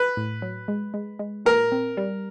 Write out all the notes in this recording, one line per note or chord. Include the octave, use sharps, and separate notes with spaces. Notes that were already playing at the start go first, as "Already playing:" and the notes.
Already playing: B4
A2
F#3
G#3
G#3
G#3
A#2 A#4
C4
G3